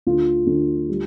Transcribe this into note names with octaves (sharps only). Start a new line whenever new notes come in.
D2 F4
D2
G3